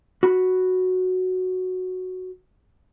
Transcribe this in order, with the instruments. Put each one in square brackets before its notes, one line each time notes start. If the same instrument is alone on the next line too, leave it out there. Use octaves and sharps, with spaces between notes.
[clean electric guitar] F#4 B5